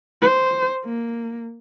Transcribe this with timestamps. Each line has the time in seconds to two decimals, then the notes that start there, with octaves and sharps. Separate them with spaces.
0.22 C5
0.85 A#3